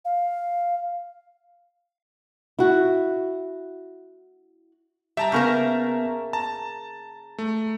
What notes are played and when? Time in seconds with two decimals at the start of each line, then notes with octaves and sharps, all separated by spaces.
0.05 F5
2.59 E4 F#4
5.17 G3 E5 A5 A#5
5.32 C#3 A#3 B3 A#4 C#6 G6
6.33 A5 A#5
7.38 A3